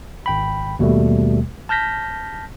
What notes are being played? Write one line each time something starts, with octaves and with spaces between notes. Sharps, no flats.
G#1 G5 B5
D#2 B2 G3 A3
A5 F6 G6 A#6 B6